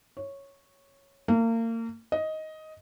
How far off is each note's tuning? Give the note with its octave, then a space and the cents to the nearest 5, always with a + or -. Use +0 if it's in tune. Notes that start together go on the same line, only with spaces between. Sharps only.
C#5 -5
A#3 -35
D#5 +10